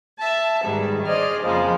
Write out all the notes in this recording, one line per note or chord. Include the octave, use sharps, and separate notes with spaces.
E5 A5
G#2 D#3 G3 B3 G#4
G#4 C5 D5 D#5 F6
F2 C#3 F3 G#3 A#3